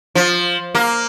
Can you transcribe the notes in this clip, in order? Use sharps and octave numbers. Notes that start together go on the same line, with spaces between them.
F3
A#3